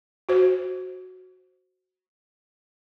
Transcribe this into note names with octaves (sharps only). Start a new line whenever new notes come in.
F#4 C5